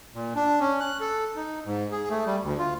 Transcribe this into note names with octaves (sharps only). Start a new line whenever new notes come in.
A#2
D4
C#4
F#6
A4
D#4
G#2
G#4
A3
G3
D2
F4